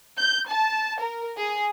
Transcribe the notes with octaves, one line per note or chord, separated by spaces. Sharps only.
G6
A5
A#4
G#4